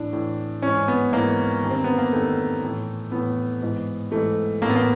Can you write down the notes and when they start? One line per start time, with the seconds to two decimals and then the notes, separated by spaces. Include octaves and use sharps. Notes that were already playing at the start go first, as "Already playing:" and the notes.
Already playing: A2 E3 D4
0.13 A2 E3
0.62 G#2 E3 C#4
0.88 B3
1.12 G#2 E3 A#3
1.63 G2 D#3
1.70 C4
1.84 B3
1.98 A#3
2.12 G2 D#3 A3
2.63 A2 E3
3.12 A2 E3 B3
3.62 G#2 E3
4.11 G#2 E3 A3
4.62 A2 E3 A#3
4.69 B3
4.76 A#3